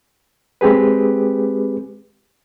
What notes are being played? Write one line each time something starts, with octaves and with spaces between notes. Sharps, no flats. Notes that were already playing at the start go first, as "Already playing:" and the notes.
G#3 C4 G4 G#4 B4